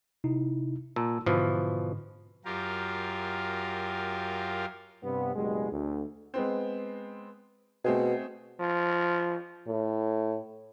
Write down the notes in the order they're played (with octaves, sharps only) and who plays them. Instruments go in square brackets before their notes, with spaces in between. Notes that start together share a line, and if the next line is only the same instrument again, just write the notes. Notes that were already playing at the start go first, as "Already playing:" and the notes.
[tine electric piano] C3 D#4 E4
[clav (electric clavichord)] A#2 [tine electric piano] A5 E6
[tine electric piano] G#2 D3 [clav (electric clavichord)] B2 E3 F3
[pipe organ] F#2 F4 G4 A#4
[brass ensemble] G2 C3 B3
F#1 B2 G3 G#3
D2
[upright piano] G#3 B3 C4
[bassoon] B2 [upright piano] A3 C4 G#4
[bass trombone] F3
[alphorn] A2